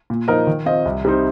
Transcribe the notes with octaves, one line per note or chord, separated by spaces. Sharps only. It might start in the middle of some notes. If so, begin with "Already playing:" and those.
A#2
F3 D#4 A#4 D#5
D#3
C4 F4 D#5
C2
C3 G3 D#4 C5